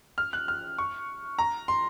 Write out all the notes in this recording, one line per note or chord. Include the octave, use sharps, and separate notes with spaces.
F6
F#6
F6
C#6
A#5
C6